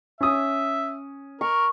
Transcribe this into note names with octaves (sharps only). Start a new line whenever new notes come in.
C#4 E5 D#6
A#4 C#6